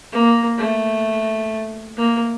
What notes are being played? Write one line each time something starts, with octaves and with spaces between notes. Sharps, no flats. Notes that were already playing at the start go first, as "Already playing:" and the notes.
A#3
A3
A#3